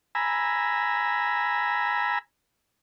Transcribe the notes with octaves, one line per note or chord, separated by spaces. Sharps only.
G#5 A#5 B5 E6